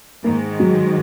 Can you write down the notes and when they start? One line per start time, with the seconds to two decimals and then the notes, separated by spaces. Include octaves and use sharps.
0.24 G#2 D#3 G#3 A#3
0.60 F#3